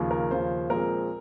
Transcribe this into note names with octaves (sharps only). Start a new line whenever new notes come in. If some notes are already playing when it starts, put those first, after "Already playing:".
Already playing: D#2 C#3 F3
A#4
D#2 C#3 F3 C5
A#2 F3 G#3 C4 A#4